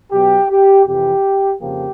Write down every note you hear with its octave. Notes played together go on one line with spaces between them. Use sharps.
B2 F#3 B3 G4
G4
F2 C3 E3 G4
F2 C#3 F3 A#3 G4